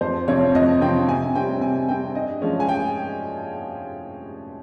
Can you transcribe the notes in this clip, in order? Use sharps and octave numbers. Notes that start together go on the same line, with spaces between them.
F2 C5
C3 F3 C4 C#5
F2 D#5
C3 F3 C4 G5
C3 G#5
G3 C4 G5
C3 G#5
G3 C4 G5
G2 D#5
F3 G#3 C#4
G#5
G5